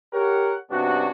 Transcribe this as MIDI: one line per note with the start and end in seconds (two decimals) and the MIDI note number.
0.13 0.57 67
0.13 0.57 70
0.13 0.57 73
0.13 0.57 78
0.71 1.10 43
0.71 1.10 48
0.71 1.10 59
0.71 1.10 61
0.71 1.10 62
0.71 1.10 66